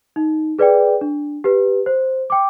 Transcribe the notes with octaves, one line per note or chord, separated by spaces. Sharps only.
D#4
G#4 B4 D5 G5
D4
G4 B4
C5
G5 D6